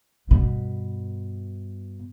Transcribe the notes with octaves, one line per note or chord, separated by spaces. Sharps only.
G2 B2